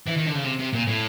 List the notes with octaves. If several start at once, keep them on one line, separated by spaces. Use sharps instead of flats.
E3
D#3
D3
C#3
C3
C3
A#2
A2